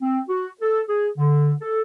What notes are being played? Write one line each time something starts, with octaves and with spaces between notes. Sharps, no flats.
C4
F#4
A4
G#4
D3
A4